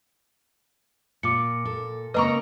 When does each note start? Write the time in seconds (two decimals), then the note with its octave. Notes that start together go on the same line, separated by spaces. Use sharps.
1.23 A#2 D6 C#7
1.65 A#2 A4
2.14 C#3 A#3 C4 B4 D#5 A#5 C#6